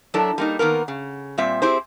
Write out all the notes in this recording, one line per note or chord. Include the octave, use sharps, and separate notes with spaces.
F#3 D4 E4 A4 A#4
G3 A#3 D#4
D#3 A#3 B3 A#4
C#3
A#2 G3 C4 E5
C4 E4 G4 G#4 C5